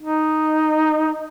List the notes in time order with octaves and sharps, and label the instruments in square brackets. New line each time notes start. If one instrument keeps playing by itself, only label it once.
[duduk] D#4